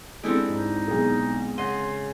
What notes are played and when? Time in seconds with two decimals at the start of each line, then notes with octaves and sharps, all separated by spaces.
0.23 G#3 C4 D4 E4 G4 A4
0.49 G#2 D#4
0.88 B1 G#4
1.58 C#3 D#5 F#5 C6